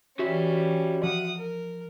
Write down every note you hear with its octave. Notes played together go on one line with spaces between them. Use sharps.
E3 G3 C#4 F#4 E5
F3 F#5 D#6
A#4